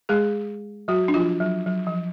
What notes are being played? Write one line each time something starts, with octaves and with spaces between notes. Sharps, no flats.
G#3 G#4
F#3 F#4
D4
F3 F4
F#3
F#3
F3